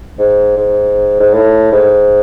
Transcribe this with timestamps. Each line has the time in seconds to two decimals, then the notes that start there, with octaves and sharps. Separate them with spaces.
0.19 G#2
0.57 G#2
1.20 G#2
1.33 A2
1.72 G#2